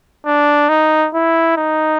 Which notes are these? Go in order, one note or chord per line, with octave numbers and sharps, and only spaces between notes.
D4
D#4
E4
D#4